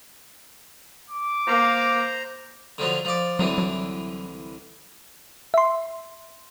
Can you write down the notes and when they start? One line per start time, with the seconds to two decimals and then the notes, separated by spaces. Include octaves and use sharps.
1.11 D6
1.47 A#3 C5 A#5
2.78 D3 F3 F#3
3.05 F3 D5
3.39 C2 D3 E3 F#3
3.58 F#3
5.54 E5 C6